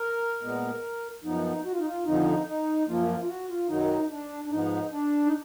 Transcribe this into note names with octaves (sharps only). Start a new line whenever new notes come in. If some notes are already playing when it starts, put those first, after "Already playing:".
Already playing: A#4
A#2 G#3 B3
F#2 F3 B3 D#4
F#4
F4
D#4
F4
F2 D3 F3 D#4
D#4
F#2 F3 A#3 F4
F4
F4
F#4
F4
F#2 D#3 F#3 D#4
D4
D4
G#2 F3 B3 D#4
D4
D#4